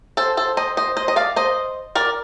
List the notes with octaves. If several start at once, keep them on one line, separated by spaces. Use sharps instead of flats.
A4 C5
A4 C5
C5 D#5
C5 D#5
C5 D#5
D#5
D5 F5
C5 D#5
A#4 D5